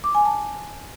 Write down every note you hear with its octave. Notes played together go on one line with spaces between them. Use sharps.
D6
G#5
A5